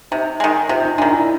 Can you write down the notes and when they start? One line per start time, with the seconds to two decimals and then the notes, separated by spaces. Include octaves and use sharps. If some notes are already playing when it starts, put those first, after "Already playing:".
0.11 C3 D#4
0.40 D#3 G#3
0.69 C3 F4
0.84 D#4
0.98 D#3 G#3 D4
1.12 E4